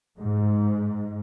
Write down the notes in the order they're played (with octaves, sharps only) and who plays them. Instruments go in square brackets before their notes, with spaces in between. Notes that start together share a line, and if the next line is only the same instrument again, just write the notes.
[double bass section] G#2